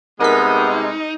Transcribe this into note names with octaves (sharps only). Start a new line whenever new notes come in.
C3 G3 G#3 B3 D#4 A#4 G#5 B6